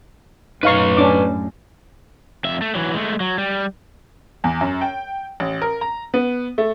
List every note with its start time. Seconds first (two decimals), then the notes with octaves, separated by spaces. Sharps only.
0.63 F#2 A2 D#4 B4 C#5 F5 C#6
0.97 C#4 D4 D6
2.44 F2 E5
2.62 A3
2.75 E3 F#3
2.93 G#3 A3
3.20 F#3
3.38 G3
4.44 E2
4.61 F#2
4.81 G5
5.40 A1
5.62 A#4
5.81 A#5
6.14 B3
6.58 A3